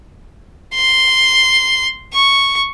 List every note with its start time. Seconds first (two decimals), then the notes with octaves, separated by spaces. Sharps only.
0.75 C6
2.14 C#6